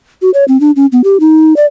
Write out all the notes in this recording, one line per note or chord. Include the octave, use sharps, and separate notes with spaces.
F#4
C#5
C4
D4
C#4
B3
G4
D#4
D5